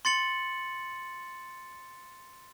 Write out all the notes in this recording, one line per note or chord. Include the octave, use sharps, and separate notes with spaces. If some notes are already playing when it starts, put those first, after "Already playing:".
C6 A6 C#7 F#7